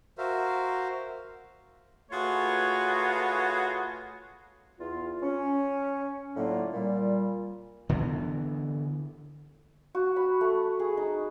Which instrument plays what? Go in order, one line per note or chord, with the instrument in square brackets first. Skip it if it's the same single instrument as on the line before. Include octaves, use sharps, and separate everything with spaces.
[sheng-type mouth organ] F#4 A#4 C5 E5 F5
[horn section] A3 F4 F#4 G#4 B4 C#5
[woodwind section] E2 F4
C#4
A2 D3 F#3 A#3 F4
A#2 G3
[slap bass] D3 E3 B3
[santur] F#4
B5
A3
G#4
D#4